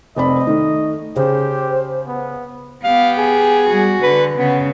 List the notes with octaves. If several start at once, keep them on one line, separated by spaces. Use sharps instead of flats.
F1 C4 D5 D#5 B5
D#3 A3
C#3 G4 C5
B3
B3 G4 F5
G#4
G3 F#4
D3 B4
C#3 B3